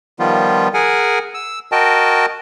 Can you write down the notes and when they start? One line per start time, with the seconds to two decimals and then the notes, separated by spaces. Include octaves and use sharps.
0.19 D#3 F3 G3 B3 F4
0.74 G#4 A#4 F#5 G#5
1.34 E6
1.72 F#4 A#4 D#5 G5 A5